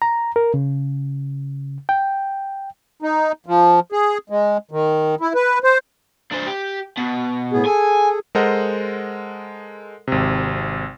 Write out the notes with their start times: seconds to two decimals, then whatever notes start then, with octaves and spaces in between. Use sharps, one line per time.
0.02 A#5
0.36 A#4
0.54 C#3
1.89 G5
3.02 D#4
3.46 F3
3.92 G#4
4.30 G#3
4.71 D#3
5.21 E4
5.35 B4
5.64 C5
6.31 D4 C5
6.46 G4
6.98 B2
7.53 A2 B3 G#4
7.65 G#4 A4 G#5
8.35 G#3 A4 A#4 C5 D#5 F#5
10.07 G#1 C3